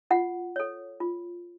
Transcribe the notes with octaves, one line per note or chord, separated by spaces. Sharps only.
F4 F#5
A4 C#5
F4